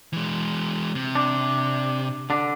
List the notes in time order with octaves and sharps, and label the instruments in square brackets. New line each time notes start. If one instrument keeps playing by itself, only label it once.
[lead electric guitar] E3 G#3
C3
[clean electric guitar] D4
D3 D4